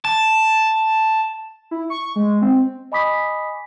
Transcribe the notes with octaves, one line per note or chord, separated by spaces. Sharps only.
A5
E4
C#6
G#3
C4
D#5 G#5 B5 D6 D#6 B6